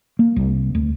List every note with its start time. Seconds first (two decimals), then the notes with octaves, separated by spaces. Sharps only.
0.19 A#3
0.36 C2
0.75 D2